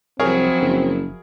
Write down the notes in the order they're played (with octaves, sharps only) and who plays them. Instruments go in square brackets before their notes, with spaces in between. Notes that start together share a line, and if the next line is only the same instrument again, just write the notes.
[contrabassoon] C2 [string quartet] F3 F#3 E4 [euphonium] C4 [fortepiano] G#4 A#4 C#5
[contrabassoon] F#1